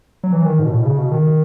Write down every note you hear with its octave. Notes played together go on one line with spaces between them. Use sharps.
F#3
E3
D#3
G#2
B2
A2
B2
C#3
B2
D#3